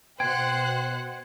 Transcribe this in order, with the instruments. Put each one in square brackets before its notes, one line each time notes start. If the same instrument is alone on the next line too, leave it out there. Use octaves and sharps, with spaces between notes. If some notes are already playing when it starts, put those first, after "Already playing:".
[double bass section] B2 [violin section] C5 F#5 F#6 [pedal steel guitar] G5 C6 [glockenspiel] G#6